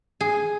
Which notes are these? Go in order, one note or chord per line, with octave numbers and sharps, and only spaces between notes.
G#4